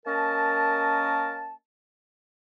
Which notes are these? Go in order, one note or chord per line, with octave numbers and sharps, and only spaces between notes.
A#3 C#4 A#4 D#5 A5